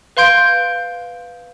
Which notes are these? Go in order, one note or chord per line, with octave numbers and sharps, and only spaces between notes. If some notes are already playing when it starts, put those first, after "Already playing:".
B4 F5 C6 G6 D7